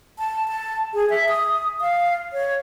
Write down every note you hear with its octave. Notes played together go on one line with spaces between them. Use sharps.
A5
A5
G#4
E5
D#6
F5
C#5